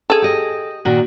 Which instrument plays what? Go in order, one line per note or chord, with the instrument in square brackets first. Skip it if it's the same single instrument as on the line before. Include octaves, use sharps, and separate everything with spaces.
[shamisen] G#4 A4
[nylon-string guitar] G4 D#5
A#2 D#3 F#4